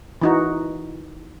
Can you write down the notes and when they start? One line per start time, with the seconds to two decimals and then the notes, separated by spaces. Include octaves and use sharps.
0.22 E3 D#4 F#4